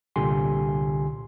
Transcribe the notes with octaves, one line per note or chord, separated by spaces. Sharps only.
C2 A#2 D3 G4 G#5 C6